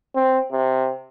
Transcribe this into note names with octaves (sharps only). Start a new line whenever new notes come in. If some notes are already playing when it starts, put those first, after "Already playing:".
C4
C3